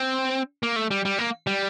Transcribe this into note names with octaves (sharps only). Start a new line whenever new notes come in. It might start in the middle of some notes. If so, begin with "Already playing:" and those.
Already playing: C4
A#3
A3
G3
G3
A#3
G3